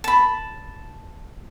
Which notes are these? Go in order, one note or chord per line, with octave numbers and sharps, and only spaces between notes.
A5 B5